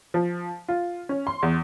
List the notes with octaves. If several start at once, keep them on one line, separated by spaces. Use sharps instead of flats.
F3
F4
C#4
C6
E2